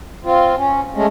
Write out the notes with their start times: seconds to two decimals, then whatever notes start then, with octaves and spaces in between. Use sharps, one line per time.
0.24 C4 F4
0.57 C#4
0.94 G#3 A3 C#4